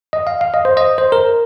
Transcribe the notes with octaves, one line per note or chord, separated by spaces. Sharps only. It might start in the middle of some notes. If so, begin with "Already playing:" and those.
D#5
F5
F5
D#5
C5
D#5
C5
A#4